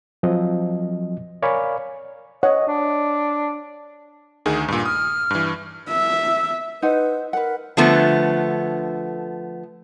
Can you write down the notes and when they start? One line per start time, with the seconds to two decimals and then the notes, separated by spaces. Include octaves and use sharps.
0.23 F3 F#3 C4 D#5
1.42 A#4 C#5 D5 F5 G#5 B5
2.43 C#5 D#5 F#5
2.68 D4
4.46 D2 D#3 G#4
4.68 G2 A#2
4.85 D#6 F6
5.31 G2 E3
5.89 E5
6.82 D#4 B4 C5 F#5
7.33 A#4 B4 F#5
7.77 D3 F3 A3 B3